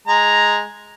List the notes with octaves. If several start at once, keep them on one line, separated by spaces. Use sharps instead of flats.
G#3 A#5